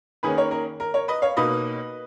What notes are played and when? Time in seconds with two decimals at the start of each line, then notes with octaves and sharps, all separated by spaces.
0.23 D#3 A#3 C#4 G#4 B4
0.37 A#4 C#5
0.51 A#4
0.80 A#4
0.94 A#4 C#5
1.08 B4 D#5
1.22 C#5 F5
1.37 B2 A#3 D#4 B4 D#5